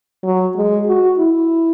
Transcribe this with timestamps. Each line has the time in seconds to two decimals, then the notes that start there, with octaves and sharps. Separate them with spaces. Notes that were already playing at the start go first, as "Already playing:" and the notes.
0.24 F#3
0.56 G#3
0.87 F#4
1.18 E4